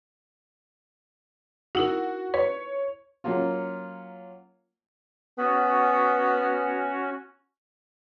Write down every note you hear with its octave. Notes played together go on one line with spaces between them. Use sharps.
D#4 E4 F#4 A#4
B4 C#5
F#3 A#3 C#4 F4
B3 C#4 F#4